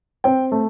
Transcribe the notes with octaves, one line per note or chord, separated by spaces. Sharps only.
C4 G5
A3